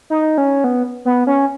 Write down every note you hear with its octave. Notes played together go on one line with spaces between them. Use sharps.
D#4
C#4
B3
B3
C#4